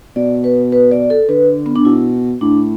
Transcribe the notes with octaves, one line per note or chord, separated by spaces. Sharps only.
B2 D5
B4
B4
D5
A4
D3 B4
B3
D4
B2 E4
A2 D4